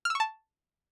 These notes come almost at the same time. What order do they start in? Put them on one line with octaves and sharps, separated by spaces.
F6 E6 C#6 A5